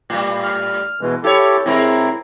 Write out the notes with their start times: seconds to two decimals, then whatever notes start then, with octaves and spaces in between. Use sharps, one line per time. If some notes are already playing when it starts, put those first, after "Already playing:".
0.10 A2 G3
0.44 F6
1.01 B2 E3 G#3
1.24 E4 G4 A4 C#5
1.66 B2 G#3 C4 E4 A#4